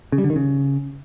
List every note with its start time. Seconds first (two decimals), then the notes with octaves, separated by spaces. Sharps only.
0.12 C#3
0.18 G3
0.24 D3
0.30 D#3
0.36 C#3